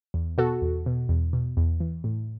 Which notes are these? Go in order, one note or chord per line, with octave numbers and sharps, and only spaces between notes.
E2
B2 F#4 A4
E2
B2
E2
B2
E2
E3
A2